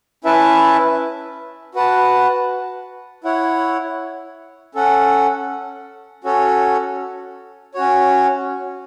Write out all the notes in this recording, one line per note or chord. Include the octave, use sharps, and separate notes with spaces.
C#4 E4 B4 E5 A5
F#4 B4 F#5 A5
E4 C#5 F#5
C#4 A4 F#5
C#4 F#4 A4 C#5
C#4 F#4 C#5